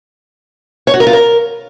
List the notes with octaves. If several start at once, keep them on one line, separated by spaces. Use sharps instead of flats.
C#5
F#4
A#4
F4
A#4